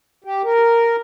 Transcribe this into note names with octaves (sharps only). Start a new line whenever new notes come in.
G4
A#4